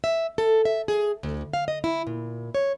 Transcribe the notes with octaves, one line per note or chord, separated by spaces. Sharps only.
E5
A4
E5
G#4
D2
F5
D#5
E4
A#2
C#5